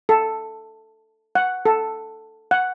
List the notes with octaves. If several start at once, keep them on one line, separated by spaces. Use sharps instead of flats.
A4
F#5
A4
F#5